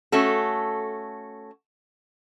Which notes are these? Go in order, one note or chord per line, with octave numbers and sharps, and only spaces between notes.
A3 C#4 F#4 A4